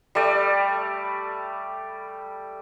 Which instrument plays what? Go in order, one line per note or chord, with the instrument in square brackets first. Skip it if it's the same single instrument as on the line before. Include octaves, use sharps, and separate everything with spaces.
[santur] G3 A3 D5